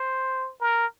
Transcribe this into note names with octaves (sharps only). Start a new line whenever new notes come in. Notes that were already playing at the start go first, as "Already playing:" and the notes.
Already playing: C5
A#4